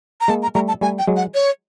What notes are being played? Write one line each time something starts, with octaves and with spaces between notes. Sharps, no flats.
A#5
G#3 A#3 A5
A#5
G3 A3 A#5
A5
G3 A3 G#5
G5
F#3 G#3
F#5
C#5